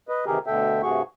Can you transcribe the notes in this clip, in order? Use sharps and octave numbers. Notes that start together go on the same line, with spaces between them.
B4 D#5
C3 D#3 E3 G4 G#4 A#4
D2 B2 D3 A4 E5 G5
G2 C3 A3 F#4 G#4 C#6